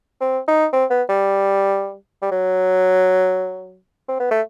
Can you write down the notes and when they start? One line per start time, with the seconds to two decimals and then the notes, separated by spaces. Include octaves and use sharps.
0.21 C4
0.48 D#4
0.73 C4
0.90 B3
1.09 G3
2.22 G3
2.31 F#3
4.08 C4
4.20 B3
4.31 A3